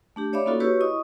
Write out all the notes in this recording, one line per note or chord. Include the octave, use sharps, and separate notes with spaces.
A3 D4 G4
C#5 D5 E5 F5 B5 D6
A#3 C#4 D#4 F4 F#4 A4
F#4 G4 B4 C#5 C#6 E6
E4 D#5 C#6 D#6